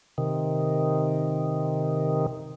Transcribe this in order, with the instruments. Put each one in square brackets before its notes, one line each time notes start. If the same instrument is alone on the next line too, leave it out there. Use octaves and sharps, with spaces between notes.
[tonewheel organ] C3 D#3